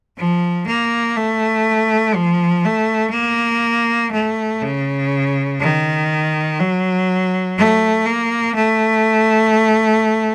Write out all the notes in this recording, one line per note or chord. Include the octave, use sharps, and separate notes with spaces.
F3
A#3
A3
F3
A3
A#3
A3
C#3
D#3
F#3
A3
A#3
A3